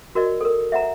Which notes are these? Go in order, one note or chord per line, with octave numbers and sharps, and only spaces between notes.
F#4 A#4 D5 D#5
A4 A#4
E5 F#5 A#5